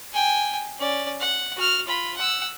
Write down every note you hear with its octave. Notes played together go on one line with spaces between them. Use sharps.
G5 G#5
C#4 D5
F#5
F#4 F6
F4 B5
F#5 E6